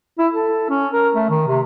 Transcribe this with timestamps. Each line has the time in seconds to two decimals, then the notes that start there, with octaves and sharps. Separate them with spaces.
0.19 E4
0.32 A4
0.69 C#4
0.93 A#4
1.15 A3
1.30 D#3
1.48 C3